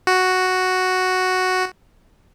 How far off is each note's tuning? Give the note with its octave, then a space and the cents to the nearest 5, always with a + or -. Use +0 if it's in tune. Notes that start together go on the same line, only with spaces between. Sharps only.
F#4 +0